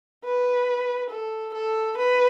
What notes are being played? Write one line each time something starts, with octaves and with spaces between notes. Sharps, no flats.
B4
A4
A4
B4